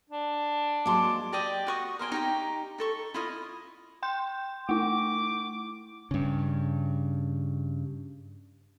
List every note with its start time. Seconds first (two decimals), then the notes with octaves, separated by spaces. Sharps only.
0.10 D4
0.86 F#3 G#3 A#3 A5 C6 D6
1.33 G4 D5 D#5 G5
1.67 F#4 C#6 D#6
1.99 A#4 C5 G5 G#5
2.12 D#4 G4 A#5
2.78 D#4 A4 C#6
3.14 E4 F4 D#5
4.03 G5 C6 G6
4.69 A3 E4 D6
6.11 G2 C#3